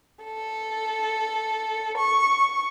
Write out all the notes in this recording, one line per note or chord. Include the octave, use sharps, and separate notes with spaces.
A4
C#6